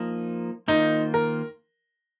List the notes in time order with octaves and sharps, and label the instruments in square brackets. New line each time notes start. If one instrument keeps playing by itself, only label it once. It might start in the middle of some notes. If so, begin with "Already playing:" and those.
Already playing: [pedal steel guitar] F3 A#3 D#4
[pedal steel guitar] D#3 A#3 F4 C5 [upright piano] D#4
[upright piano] A#4